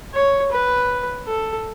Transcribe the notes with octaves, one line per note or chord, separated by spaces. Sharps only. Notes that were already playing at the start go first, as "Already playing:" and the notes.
C#5
B4
A4